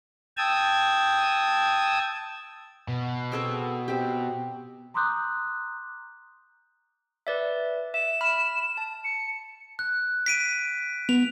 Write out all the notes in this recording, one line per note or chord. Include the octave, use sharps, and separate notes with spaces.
G5 A5 D#6 E6 G#6
B2
C4 G#4 A4
C4 G4
A#5 C6 D6 D#6 F#6 G6
B4 D5 E5
E5 E7
B5 F6
A5
C#7
F#6
B6 D7 D#7
B3 F7